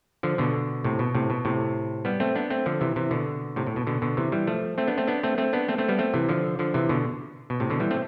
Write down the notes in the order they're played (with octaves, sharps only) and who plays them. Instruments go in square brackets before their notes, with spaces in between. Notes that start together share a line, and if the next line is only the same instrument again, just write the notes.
[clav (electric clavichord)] D3 F3
B2 D3
A2 C3
B2
A2 C3
B2
A2 C3
G3 B3
A3 C4
B3 D4
A3 C4
D3 F3
C3 E3
C3 E3
B2 D3
A2 C3
A2
B2
B2 D3
B2 D3
C3 E3
E3 G3
F3 A3
A3 C4
B3 D4
A3 C4
B3 D4
A3 C4
A3 C4
B3 D4
A3 C4
A3 C4
G3 B3
A3 C4
C3 E3
D3 F3
D3 F3
C3 E3
B2 D3
B2
A2 C3
B2 D3
E3 G3
A3 C4